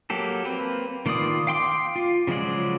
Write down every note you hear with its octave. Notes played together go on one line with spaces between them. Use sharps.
F#3 A#3 G4 A4
A#3 C4 B4
D#3 A#3 F4 D5 D#6
F5 G5 C6 D6
F4
C#3 F3 F#3 G#3 D5